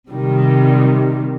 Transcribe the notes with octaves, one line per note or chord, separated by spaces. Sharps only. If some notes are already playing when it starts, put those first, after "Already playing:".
C3 D#3 G3